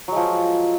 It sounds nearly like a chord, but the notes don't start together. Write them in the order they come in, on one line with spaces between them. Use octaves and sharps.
F#3 G#3 F3